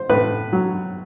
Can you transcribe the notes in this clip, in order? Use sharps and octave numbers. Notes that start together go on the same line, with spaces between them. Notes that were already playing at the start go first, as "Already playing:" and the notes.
Already playing: C5
A2 B4
F#3